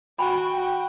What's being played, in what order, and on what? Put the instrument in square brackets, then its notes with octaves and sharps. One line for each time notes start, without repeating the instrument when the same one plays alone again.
[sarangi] F#4 [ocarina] G5 [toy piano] G#5 B5